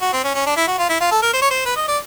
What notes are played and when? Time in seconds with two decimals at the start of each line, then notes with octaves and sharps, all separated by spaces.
0.02 F#4
0.13 C4
0.24 C#4
0.35 C#4
0.46 D4
0.57 E4
0.68 F#4
0.79 F4
0.89 E4
1.01 F4
1.11 A4
1.22 A#4
1.33 C5
1.42 C#5
1.51 C5
1.66 B4
1.77 D#5
1.88 D5